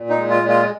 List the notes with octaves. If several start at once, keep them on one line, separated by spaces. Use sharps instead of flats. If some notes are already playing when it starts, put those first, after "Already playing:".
Already playing: A#2
D#4
G#3
F4
A#2
F4